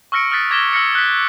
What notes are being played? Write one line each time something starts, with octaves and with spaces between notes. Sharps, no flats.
C#6 E6 F6 A#6 C#7 D7
D#6 F6 F#6 A6 B6
D6 G#6 A#6 B6 E7 G7
E6 F6 A#6 C#7
F#6 B6